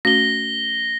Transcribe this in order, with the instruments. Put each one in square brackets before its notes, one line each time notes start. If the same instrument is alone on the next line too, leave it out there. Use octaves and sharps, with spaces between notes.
[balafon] A3 C#4 F#4 [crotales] A#6 G7